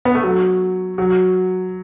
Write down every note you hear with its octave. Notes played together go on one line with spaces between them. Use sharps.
B3
A3
F#3
F#3